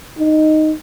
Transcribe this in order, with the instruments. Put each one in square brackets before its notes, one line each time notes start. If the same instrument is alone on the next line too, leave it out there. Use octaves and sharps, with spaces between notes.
[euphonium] D#4